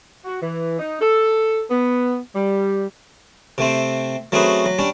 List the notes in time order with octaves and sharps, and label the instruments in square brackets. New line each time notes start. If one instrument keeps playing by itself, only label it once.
[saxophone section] F#4
E3
D#4
A4
B3
G3
[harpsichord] C3 A3 C4
F#3 A3 C4 C#4 G#4 B4
F#3
G3 C#4 D4